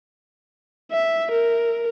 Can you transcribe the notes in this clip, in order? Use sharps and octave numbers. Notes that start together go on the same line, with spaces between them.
E5
A#4